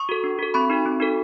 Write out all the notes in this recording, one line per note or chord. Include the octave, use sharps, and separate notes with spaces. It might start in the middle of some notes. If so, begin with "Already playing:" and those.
Already playing: C#6 D#6
F#4 A4
D4
F#4 A4
C4 B5 C#6
D#4 F#4 A4
C4
D#4 F#4 A4